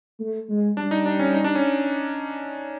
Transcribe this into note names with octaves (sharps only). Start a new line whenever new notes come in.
A3
G#3
G3 D4
D#4
D4
C#4
D#4
D4
C#4